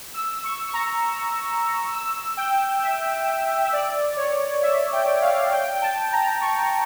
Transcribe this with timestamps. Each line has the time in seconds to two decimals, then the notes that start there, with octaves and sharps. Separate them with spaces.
0.14 E6
0.44 C#6
0.69 C#6
0.73 A#5
1.93 E6
2.37 G5
2.83 E5
3.63 E5
3.73 D5
4.17 C#5
4.62 E5
4.93 G5
5.22 F5
5.52 G5
5.76 G5
5.82 A5
6.12 A#5
6.41 C#6